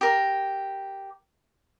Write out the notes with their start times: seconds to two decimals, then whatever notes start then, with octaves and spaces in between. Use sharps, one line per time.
0.01 G4 A#4